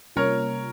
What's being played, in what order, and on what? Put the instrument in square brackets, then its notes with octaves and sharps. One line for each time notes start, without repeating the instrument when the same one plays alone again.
[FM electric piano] C3 G3 A#3 C#4 F4 [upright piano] A#4 C#5